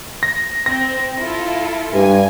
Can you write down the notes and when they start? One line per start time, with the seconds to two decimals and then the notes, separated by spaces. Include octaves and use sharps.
0.23 A#6
0.66 C4 A#6
1.20 E4 F4 A4
1.94 G2 G#5